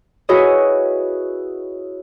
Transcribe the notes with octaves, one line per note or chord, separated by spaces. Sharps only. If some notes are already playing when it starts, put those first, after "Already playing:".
E4 F#4 G#4 B4 C#5 D#5